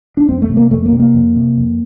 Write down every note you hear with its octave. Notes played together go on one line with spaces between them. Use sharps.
D4
F2 C4
A3
C3
A#3
F2 A3
A#3
C3
A#3
F2
C3
F2